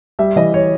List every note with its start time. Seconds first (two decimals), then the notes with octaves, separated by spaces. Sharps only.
0.19 G3 E5
0.36 E3 D#5
0.54 C#5